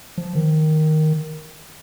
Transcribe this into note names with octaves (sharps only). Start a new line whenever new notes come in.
F3
D#3